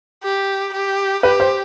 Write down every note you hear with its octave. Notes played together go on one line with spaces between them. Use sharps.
G4
G4
G4 B4
C5